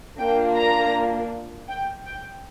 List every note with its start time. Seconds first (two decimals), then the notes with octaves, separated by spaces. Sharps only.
0.19 A#3 D4 F4 G5
0.56 A#5
1.68 G5
2.05 G5